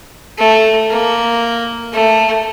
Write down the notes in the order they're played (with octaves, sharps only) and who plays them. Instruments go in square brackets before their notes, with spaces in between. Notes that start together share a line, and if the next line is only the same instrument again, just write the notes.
[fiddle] A3
A#3
A3